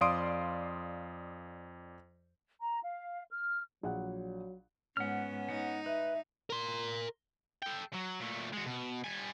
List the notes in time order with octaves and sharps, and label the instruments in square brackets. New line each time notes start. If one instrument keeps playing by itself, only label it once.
[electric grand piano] F2 D5 F5 C6 D#6 D7
[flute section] A#5
F5
F6
[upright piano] A#1 F#5 [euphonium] F#3
[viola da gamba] G#2 [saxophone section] B3 C#4 [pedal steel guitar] F#5 F6
[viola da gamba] D#4 [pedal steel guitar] F#5
[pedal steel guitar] B4 [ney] E5
[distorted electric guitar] A#4 C6
A4 G5
F#3
A#2 A3
G#3 F#4
B2
G3 G#5